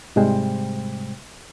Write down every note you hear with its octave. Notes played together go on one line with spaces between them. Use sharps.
G#2 C3 G3 G#3 C5 G5